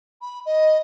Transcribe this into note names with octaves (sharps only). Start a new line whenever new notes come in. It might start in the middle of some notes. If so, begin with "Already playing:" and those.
B5
D#5